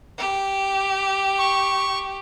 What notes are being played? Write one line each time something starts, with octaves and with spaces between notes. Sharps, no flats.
G4
C#6